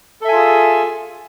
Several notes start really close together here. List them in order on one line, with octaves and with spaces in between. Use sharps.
A4 E5 G#5 F4 G#4